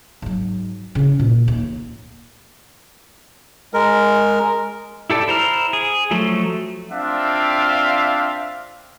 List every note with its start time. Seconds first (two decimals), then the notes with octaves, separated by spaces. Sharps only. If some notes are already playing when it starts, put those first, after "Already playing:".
0.22 G#2 F#3
0.95 C#3 E4
1.19 A#2
1.48 D#2
3.74 G#3 A#4
5.10 E4 G4 A4 D5
5.28 E4 C5 A#5 F6
5.73 G#4
6.11 F3 F#3 A3
6.91 C4 D4 F4 E5 F5